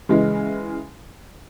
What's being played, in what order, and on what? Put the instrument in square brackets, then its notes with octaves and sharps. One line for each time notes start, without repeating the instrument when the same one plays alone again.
[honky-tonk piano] C#3 E3 G#3